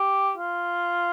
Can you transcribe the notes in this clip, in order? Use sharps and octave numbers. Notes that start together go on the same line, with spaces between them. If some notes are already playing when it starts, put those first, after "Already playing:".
Already playing: G4
F4